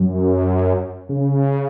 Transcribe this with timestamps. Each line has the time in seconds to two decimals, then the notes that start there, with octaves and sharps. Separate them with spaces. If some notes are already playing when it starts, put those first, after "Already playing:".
Already playing: F#2
1.09 C#3